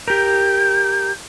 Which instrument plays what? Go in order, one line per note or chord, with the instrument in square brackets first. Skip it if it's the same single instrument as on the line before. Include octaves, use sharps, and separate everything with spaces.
[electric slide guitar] G4 A#4 [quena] G6